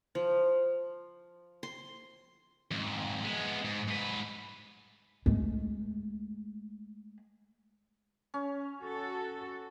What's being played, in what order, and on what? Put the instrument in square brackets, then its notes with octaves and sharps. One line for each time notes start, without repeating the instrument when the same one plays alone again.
[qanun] F3
C6
[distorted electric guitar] F2 G#2
G#3 B3
G#2
G#2 B4
[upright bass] G#3 A3
[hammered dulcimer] C#4
[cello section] F#4 A4